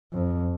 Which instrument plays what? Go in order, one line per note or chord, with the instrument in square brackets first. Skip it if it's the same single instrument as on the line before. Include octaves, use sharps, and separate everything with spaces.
[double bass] F2